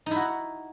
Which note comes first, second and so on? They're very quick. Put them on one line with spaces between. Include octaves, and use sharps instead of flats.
D#4 E4 F#4